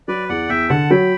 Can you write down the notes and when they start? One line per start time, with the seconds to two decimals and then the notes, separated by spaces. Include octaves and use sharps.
0.08 F#3 B4 D5
0.29 E2 D5 F#5
0.49 E2 E5 G5
0.69 D3 F#5 A5
0.90 F#3 G5 B5